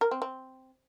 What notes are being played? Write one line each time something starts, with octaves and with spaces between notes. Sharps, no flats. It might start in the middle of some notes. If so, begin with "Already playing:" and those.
A#4
C4
C4